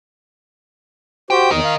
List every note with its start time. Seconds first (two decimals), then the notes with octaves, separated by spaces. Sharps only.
1.30 F#4 G4 C5 G5
1.51 E2 A#4 D#5
1.65 F5